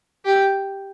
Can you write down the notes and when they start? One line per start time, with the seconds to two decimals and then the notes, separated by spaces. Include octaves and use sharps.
0.25 G4